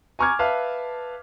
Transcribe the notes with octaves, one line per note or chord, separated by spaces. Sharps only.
G#5 A#5 C#6 D6 F6 G#6
B4 E5 F5 A5